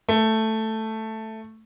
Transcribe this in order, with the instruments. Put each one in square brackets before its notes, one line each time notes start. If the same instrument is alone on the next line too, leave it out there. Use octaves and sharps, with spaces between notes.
[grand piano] A3